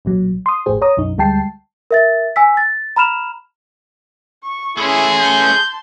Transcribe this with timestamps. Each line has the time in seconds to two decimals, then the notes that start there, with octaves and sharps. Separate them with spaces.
0.05 B1 A#2 F#3
0.46 C6 D#6
0.66 G#1 F2 A2 G4 G#4 C5
0.82 C#5 A#5 D#6
0.97 B1 F#2 D#4
1.18 D2 G3 G#3 G5 A5 C7
1.91 A#4 E5 A6
2.36 G#5 E6 B6
2.57 A6
2.96 A#5 B5 F6 E7 F7
4.44 C#6
4.77 A3 C#4 E4 G#4 A5 C6
5.19 G6